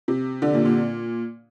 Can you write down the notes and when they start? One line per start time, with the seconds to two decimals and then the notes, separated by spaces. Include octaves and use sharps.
0.08 C3
0.42 D3
0.54 A#2
0.65 A#2